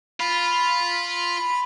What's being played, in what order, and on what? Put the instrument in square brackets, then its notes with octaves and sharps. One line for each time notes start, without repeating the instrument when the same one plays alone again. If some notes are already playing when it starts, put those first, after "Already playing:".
[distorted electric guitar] F4 [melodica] B5